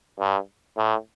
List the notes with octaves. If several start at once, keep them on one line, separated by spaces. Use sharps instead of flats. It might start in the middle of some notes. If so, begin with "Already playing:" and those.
G2
A2